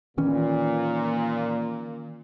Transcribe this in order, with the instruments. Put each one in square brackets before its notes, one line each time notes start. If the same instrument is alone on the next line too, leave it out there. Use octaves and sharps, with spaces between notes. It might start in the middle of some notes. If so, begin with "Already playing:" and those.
[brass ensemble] A#2 [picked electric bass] D#3 E3 C#4